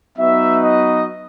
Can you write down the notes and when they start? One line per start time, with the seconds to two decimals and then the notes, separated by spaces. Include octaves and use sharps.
0.18 F#3 B3 D#4 F#4 B4 E5
0.63 D#5